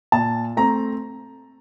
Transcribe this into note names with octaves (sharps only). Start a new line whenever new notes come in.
A#2 A5
A3 C4 A#5